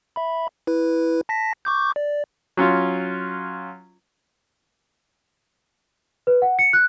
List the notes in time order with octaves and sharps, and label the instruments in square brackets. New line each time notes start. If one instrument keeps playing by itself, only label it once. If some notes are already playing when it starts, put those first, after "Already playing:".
[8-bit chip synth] E5 B5
E4 B4
A5 A#6 B6
C#6 D6 G6
D5
[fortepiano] F#3 C#4 F4
[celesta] B4
F#5
C#7
F#6